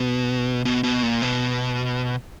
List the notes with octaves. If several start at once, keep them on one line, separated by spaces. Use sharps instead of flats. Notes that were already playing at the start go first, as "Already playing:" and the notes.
Already playing: B2
B2
B2
A#2
B2